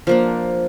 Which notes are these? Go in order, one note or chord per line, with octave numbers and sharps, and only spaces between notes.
F3 A#3 D4